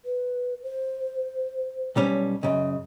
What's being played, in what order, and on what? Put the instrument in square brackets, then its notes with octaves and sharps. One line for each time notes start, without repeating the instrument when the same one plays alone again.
[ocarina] B4
C5
[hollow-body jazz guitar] B1 G3 C#4
[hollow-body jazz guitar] F#2 C#3 [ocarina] D#5